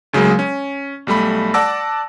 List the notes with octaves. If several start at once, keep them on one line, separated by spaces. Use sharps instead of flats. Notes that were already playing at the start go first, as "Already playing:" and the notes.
D2 C#3 F#3 G#3 A#3
C#4
B1 G3 A3 B5
D5 F#5 A5 D6 E6 A#6